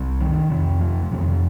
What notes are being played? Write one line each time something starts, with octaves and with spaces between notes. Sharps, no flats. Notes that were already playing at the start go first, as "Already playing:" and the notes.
Already playing: C2 C3
D#3
F2 C3 F3
F3
F2 C3 D#3
F3